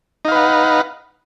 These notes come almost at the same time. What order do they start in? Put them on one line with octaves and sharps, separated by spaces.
D#4 F5 B4 F#5